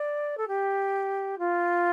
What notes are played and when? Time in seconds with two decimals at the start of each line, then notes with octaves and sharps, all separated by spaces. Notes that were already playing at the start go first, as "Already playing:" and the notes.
Already playing: D5
0.37 A4
0.48 G4
1.38 F4